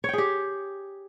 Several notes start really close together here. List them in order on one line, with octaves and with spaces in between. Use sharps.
C#5 G5 G#4 G4